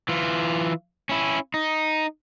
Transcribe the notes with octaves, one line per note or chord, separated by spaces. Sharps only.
E3 F4
C#4 E4
D#4